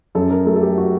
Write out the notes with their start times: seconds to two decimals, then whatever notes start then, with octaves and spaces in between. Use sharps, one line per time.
0.15 F#2 A4
0.31 A#4
0.46 F#3 A3 A4
0.56 A4
0.61 G4
0.78 F#4